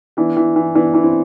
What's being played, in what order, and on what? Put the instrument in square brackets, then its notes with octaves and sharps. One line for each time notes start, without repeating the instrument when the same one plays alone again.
[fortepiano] E3 [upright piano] B3 D4
[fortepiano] E3
E3
[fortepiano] E3 [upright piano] B3 D4
[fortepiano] E3 [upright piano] D4
[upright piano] C4 E4